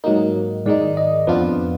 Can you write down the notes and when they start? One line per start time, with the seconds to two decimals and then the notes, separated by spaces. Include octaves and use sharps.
0.04 G#2 F#3 A#3 D#4 A#4
0.66 G#2 D#3 G#3 D#4 D5
0.97 D#5
1.27 F2 F3 B3 D4 F4 B4